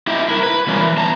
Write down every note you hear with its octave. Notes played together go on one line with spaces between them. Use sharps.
D#4 E4 G4
E4 A#4
B4
B2 E3 G3 C#4 F4 A#4
E3
E2 A5 A#5